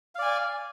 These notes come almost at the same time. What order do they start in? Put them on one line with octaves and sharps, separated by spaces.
F5 D5 G#5